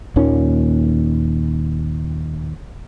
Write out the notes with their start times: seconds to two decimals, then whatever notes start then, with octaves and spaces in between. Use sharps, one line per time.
0.16 D#2 A#2 D#3 C#4